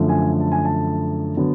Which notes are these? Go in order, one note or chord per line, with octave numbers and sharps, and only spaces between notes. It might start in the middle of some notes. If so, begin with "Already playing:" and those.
Already playing: F#2 D3 F3 A3
G#5
A5
G#5
A5
D3 F#3 B3